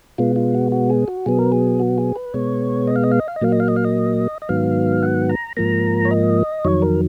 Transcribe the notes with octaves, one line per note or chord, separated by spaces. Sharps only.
B2 G#3 B3 F4
F4
F#4
F#4
G#4
F#4
B2 F#3 B3 G#4
A#4
G#4
F#4
G#4
B4
B2 G#3 B3 C#5
D#5
F5
D#5
F5
D#5
F5
D#5
A#2 F#3 A#3 F5
D#5
F5
D#5
F5
D#5
D#5
G#2 D#3 F#3 B3 F5
F#5
A#5
G#2 F3 A#3 A#5
C#5
D#5
F2 D#3 F#3 C#5
A#4